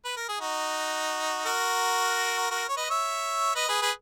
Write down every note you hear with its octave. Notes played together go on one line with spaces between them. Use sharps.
B4
A#4
G#4
D#4 F#4
F#4 A#4
F#4 A#4
C#5
B4 D#5
C#5 E5
B4 D#5
G#4 B4
G#4 B4